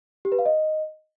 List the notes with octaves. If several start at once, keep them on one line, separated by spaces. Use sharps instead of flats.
G4
B4
F5
D#5